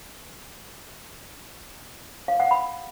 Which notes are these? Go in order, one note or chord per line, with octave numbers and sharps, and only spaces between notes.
F5
F#5
B5